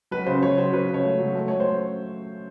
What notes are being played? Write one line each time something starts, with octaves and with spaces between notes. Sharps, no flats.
F#3 B4
C#3 C5
F#3 C#5
F#3 C5
F#3 B4
C#3
C#5
A3
F#3
A3
A3 C#5
C5